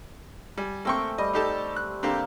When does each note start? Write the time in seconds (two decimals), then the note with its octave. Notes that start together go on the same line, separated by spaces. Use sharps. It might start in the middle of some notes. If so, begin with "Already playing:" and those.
0.58 G3 G#5
0.85 A3 A#3 C4 G5 C#6
1.18 G3 D#5
1.33 D#4 G4 A4
1.76 F#6
2.03 D3 A#3 C4 G4